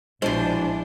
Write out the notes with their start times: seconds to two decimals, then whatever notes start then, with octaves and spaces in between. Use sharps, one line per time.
0.22 A#1 B2 F3 G#3 D4 E4 G#4 C5